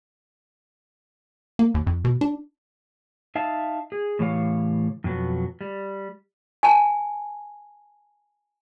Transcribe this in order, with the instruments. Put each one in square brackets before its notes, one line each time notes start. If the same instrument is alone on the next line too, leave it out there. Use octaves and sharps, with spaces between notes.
[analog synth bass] A#3
D#2
F2
B2
D4
[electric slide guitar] D#4 E5 F5 A5
G#4
A2 C#3 E3 G4 C#5 F5
F2 B2 F#3 B3
G3
[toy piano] G#5 A5